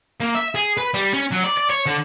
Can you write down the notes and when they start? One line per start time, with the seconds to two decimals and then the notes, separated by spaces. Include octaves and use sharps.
0.20 A#3
0.35 E5
0.55 G#4
0.77 B4
0.94 G3
1.13 C#4
1.32 F#3
1.44 D5
1.58 D5
1.70 C#5
1.86 D3